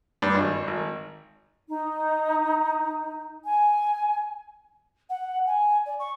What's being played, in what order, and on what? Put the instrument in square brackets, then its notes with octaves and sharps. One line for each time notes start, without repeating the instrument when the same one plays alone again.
[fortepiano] G2
G#1
G#1
[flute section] D#4
G#5
[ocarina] F#5
G#5
D5
C#6